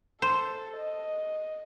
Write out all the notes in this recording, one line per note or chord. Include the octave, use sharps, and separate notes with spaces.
A4 C5
D#5